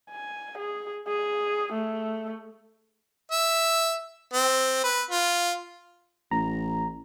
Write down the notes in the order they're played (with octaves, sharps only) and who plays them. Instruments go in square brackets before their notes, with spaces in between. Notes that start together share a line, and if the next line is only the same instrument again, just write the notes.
[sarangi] G#5
G#4
G#4
A3
[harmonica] E5
C4
B4
F4
[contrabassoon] A1 [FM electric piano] A#5